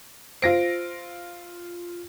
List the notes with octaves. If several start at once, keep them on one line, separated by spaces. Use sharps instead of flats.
F4 C5 A#6 D7